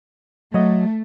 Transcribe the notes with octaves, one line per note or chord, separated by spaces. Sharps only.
F#3 A3 D#5